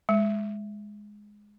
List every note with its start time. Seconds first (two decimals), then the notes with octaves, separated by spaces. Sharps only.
0.09 G#3